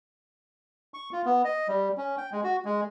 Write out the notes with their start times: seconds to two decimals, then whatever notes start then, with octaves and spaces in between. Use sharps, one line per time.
0.94 C#6
1.12 F4
1.25 B3
1.45 D#5
1.68 G3
1.97 C#4
2.18 G5
2.32 G#3
2.44 F#4
2.65 G#3